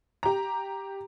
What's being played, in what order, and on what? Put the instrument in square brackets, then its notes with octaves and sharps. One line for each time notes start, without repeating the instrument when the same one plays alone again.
[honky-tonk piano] G4 A#5